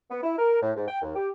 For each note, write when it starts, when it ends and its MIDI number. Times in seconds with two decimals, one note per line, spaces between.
0.11 0.19 59
0.23 0.35 64
0.39 0.61 70
0.61 0.72 45
0.76 0.85 44
0.88 0.99 79
1.02 1.12 39
1.16 1.30 67